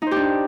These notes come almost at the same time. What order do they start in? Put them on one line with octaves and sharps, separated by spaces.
D#4 C5 G4 D4